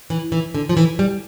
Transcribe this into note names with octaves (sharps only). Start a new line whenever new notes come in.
E3
E3
D3
F3
E3
G3